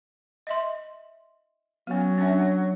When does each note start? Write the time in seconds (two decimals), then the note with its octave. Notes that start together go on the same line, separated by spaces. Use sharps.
0.47 D#5 E5 C6
1.87 F#3 B3 C#4
2.18 C#4 D4 E5